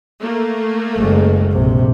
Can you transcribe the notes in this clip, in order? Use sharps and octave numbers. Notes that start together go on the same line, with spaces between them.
A3 A#3
F#1 G#3
A#1 C3